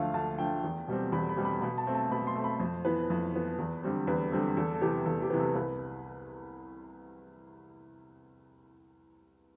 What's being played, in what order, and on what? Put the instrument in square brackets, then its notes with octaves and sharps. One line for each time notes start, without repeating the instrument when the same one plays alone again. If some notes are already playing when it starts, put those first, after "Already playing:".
Already playing: [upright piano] D2 D3 F3 A3 F5
D2 A5
D3 F3 A3 G5
E2
B2 G3 C4
E2 B5
B5
B2 G3 C4
B5
B2 B5
A5
A3 C4
A5
B2 B5
C6
A3 C4
B5
F2 C5
E3 B3 B4
F2
E3 B3
E2
D3 G3 C4
E2 B4
D3 G3 C4 A4
E2 A4
A4
C3 E3 B3 G4
E2 A4
G4
C3 E3 B3
A4
C2 B4